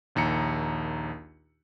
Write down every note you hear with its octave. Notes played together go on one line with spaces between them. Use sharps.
A#1 D#2 A#5 C#7